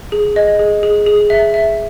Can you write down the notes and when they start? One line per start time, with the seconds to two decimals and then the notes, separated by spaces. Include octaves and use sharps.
0.12 G#4
0.36 D#5
0.59 G#4
0.83 G#4
1.06 G#4
1.30 E5
1.54 E5